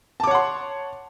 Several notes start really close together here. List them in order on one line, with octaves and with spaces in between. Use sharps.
A5 D6 C#5 F#5 C6